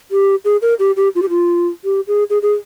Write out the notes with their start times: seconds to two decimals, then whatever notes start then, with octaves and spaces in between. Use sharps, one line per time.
0.11 G4
0.45 G#4
0.62 A#4
0.79 G4
0.97 G4
1.15 F4
1.22 G4
1.29 F4
1.84 G4
2.08 G#4
2.30 G#4
2.42 G#4